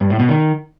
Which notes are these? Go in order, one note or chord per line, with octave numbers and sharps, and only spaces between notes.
G2
A2
B2
D#3